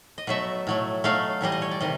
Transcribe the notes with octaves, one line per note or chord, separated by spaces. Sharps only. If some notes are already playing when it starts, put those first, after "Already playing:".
D#5
B2 F#3 A3 E5
A2 F#3 A3
B2 F#3 A3 F5
A2 E3 G3 D#5
D#5
C#5
D5
C3 D#3 G3 D#5